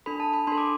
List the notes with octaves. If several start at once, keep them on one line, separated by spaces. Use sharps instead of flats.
D4 A4 B5
A5
B5
D4 A4 C6
D6